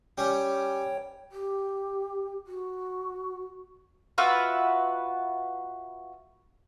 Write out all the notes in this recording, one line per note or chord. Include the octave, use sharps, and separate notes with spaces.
G3 C#4 G4 C#5 G5
G4
F#4
F4 F#4 B4 E5